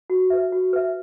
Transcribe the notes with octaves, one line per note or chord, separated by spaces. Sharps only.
F#4
B4 E5
F#4
B4 E5